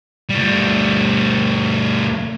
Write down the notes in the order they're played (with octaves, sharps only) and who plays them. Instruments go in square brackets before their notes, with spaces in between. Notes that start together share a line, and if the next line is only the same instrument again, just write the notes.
[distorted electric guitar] D2 G3